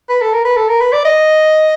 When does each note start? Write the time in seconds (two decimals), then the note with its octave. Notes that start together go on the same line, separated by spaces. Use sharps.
0.10 B4
0.22 A4
0.34 A#4
0.45 B4
0.57 A4
0.69 A#4
0.81 B4
0.93 D5
1.05 D#5